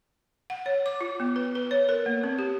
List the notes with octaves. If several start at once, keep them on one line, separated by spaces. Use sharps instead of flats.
F#5
C#5
D6
F4
B3
B4
B4
C#5
A#4
A#3
C4
G4